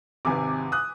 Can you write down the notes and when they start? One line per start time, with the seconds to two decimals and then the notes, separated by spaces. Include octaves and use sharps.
0.25 G#1 C3 B4 G#5 D6
0.72 D#6 F#6